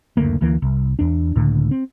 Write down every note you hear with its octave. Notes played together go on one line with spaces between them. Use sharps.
F#1 D2 A3 A#3
D2 E3 A#3
C2
E2 D4
C#2 A2 D3
C4